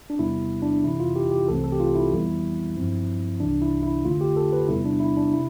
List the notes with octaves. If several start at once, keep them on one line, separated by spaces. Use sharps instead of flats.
D4
E2 C3 G3 B3 E4
D4
F2 C3 E3 E4
F4
G4
G4
C2 C3 E3 A3 C4 A4
A4
G4
F4
E4
F2 E3 G3 B3
G2 F3 C4
C2 C3 E3 D4
E4
E4
F2 D3 A3 F4
G4
A4
B4
E2 C3 G3 B3 E4
D4
E4
D4
C3 E4